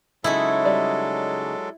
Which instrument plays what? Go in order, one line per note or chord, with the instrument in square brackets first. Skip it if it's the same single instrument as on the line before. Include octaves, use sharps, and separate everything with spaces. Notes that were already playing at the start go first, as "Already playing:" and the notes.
[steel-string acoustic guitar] C#3 C#4 D#4 [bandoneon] F#3 G#3 A4 [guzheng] E4
[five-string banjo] G3 D5